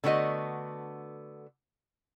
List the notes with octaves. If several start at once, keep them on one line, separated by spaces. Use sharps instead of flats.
D3 A3 B3 F#4 D#5